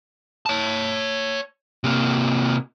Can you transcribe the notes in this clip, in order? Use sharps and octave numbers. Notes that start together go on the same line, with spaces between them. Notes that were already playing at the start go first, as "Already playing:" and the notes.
C#5 A5
C3 A#3